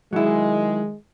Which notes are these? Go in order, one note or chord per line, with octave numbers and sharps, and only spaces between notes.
D#3 F#3 G#3 E4